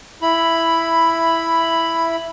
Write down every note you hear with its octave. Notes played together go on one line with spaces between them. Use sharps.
E4 B5